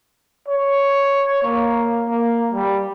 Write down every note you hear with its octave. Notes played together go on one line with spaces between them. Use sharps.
C#5
A#3
A#3
G3